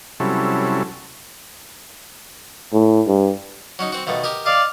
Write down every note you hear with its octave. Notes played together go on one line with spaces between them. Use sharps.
C3 F#3 G3 C#4 E4 A4
A2
G2
F#3 C#4 D#4
C4 F#4
D#2 B2 A3
G4 A#4 D#5
D5 D#5 F5